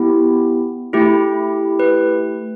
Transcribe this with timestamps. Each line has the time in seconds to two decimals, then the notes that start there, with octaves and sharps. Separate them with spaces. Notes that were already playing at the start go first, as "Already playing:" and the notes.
Already playing: B3 E4 G4
0.93 A3 E4 G4
1.79 B4